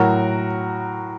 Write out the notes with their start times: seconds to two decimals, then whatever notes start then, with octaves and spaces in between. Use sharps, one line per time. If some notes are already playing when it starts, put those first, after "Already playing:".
Already playing: A2 F#3 F#4 A#4